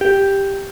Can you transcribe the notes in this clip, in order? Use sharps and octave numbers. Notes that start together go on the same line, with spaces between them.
G4